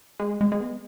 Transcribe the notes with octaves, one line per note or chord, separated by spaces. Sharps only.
G#3
G#3
G#3
B3